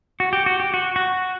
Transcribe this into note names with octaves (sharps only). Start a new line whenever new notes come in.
F#4
G4
F#4
G4
F#4
F#4